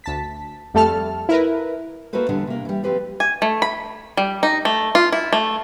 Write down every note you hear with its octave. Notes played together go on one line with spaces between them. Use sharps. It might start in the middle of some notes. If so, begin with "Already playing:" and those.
D2 A5 B6
F2 G3 A3 A4 A5 F6
E4 A#4 B4
A#3 E4 F#4 A4 B4 C5
E2 D3 G3 D4 F#5
C3 A#3
E3 G3
F3 C4 G4 B4 C5
G#5
A3
B5
G3
D#4
A3
F4
E4
A3